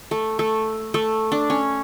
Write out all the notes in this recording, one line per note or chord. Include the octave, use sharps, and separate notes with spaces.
A3
A3
A3
D4
C#4